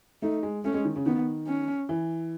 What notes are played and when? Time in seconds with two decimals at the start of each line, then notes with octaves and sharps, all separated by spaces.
0.22 A3 D#4
0.43 G#3
0.64 A3 C#4
0.74 G#3
0.85 D#3
0.96 C#3
1.06 D#3 B3
1.47 C#4
1.89 E3